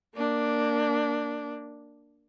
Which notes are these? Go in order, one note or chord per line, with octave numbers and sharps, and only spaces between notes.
A#3 D4